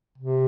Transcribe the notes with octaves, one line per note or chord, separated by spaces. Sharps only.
C3